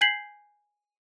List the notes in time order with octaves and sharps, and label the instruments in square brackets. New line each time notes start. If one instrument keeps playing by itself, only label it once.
[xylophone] G#5 G6 G#6 B6 C7 F#7